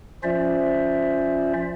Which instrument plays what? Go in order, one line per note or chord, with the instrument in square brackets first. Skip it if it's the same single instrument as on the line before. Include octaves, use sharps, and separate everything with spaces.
[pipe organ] F3 C#4 F4 C5 D5 E5